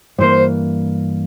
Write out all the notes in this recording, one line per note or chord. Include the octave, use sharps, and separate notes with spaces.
G2 E3 A#3 C5